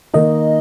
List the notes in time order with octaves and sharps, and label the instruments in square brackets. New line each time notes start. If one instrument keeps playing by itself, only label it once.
[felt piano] D#3 A#3 D#4 [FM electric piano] D#5